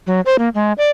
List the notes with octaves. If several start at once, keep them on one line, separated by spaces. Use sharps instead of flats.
F#3
C5
A#3
G#3
D5